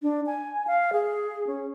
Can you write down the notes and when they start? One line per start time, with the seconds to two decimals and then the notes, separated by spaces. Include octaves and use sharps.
0.02 D4
0.26 G#5
0.67 F5
0.93 G#4
1.47 C#4